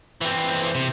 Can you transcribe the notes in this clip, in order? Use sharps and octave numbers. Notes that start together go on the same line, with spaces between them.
E3 C4
C3